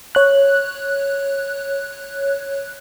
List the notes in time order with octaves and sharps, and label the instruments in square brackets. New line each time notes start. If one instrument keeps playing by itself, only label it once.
[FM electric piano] C#5 F#6